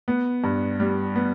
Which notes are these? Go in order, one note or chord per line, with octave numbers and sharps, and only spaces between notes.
B3
G2
G3
B3